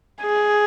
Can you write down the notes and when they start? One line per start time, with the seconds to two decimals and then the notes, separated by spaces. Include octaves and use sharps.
0.22 G#4